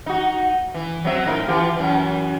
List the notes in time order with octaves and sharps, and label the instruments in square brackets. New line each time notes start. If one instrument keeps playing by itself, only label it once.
[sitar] D#4 F#4
E3
F#3 C4 E5
A2 D#4 A#4
E3 F4 G4
F#2 E3